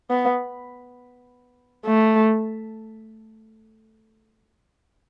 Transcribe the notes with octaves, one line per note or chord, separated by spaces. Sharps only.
B3
A3